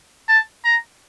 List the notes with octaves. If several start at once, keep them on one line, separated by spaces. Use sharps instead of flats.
A5
A#5